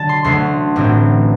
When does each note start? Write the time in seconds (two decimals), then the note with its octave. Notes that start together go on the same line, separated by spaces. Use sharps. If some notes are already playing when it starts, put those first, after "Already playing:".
Already playing: D3 F#3 A5
0.09 C6
0.24 D2 D3 F#3 C6
0.76 A1 A2 F#3 C4